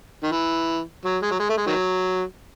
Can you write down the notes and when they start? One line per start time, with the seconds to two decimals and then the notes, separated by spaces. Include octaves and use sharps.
0.23 D#3
0.32 E3
1.05 F#3
1.22 G#3
1.31 F#3
1.40 G#3
1.50 A3
1.57 G#3
1.67 D#3 F#3